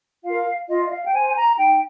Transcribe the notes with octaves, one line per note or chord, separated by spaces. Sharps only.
F4 A#4 F5
F4 D#5
D#5
F5
G5
C5 G#5
G#5
A#5
D#4 G5